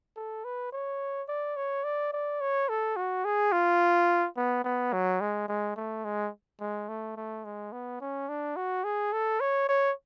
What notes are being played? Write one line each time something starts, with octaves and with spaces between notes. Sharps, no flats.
A4
B4
C#5
D5
C#5
D5
D5
C#5
A4
F#4
G#4
F4
B3
B3
F#3
G#3
G#3
A3
G#3
G#3
A3
A3
G#3
B3
C#4
D4
F#4
G#4
A4
C#5
C#5